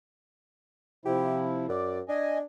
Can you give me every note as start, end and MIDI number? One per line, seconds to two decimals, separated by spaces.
1.05 1.66 48
1.05 1.66 53
1.05 1.66 64
1.05 1.44 67
1.69 2.02 42
1.69 1.98 74
2.09 2.43 62
2.09 2.38 75
2.09 2.38 80